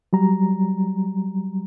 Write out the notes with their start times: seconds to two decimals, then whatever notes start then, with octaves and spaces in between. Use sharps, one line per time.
0.13 F#3 G3 A#5